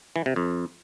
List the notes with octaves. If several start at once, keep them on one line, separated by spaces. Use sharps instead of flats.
E3
C3
F2